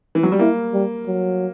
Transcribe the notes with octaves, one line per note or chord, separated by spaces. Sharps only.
E3
F#3
G3
A#3 E4
G3
F#3